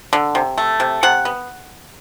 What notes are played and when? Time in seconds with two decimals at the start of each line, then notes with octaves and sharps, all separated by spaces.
0.13 D3
0.35 C3
0.58 A3
0.80 C3
1.03 C3 F#5
1.25 B3